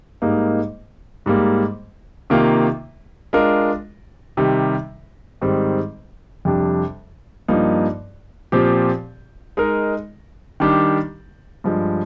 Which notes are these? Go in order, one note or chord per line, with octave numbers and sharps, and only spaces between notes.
G#2 G3 A#3 D#4 A#4
G#2 G3 A#3
C3 D#3 A#3 F4
G#3 D4 F4 A#4
C3 D#3 G3
G#2 D#3 G3 C4
F2 C3 G3 D4
G2 F3 A#3 D#4
A#2 F3 C4 G4
G#3 D#4 A#4
D#3 G3 D4 G4
G2 F3 G#3